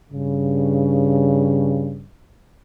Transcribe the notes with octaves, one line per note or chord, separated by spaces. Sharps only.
G2 C#3